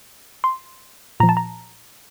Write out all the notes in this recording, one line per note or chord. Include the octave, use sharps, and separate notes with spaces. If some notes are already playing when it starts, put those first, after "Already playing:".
C6
A#2 F3 A#5
A5
A#5